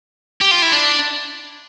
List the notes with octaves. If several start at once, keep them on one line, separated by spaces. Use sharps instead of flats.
G4
F4
E4
D4